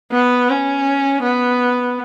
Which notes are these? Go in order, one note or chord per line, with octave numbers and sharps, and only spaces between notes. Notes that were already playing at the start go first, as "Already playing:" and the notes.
B3
C#4
B3